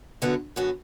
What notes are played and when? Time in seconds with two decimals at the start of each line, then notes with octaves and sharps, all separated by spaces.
0.22 F#2 D3 B3 F#4
0.56 F#2 D3 B3 F#4